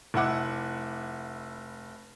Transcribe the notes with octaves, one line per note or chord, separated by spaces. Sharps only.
F1 E4 F#5 D6